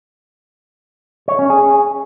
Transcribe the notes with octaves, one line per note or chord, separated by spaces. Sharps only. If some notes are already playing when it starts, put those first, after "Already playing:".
C#5
C#4
G#4